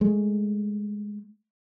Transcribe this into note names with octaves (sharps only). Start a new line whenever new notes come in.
G#3 A3